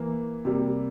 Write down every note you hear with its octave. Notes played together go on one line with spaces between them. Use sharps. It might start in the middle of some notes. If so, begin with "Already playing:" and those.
Already playing: E3 A#3
C3 G3 A#3